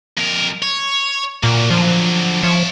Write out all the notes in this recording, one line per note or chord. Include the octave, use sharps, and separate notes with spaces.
F2 A#4
C#5
A#2 A#3 F#4
D3 F3 F#3
F3 C#5 E5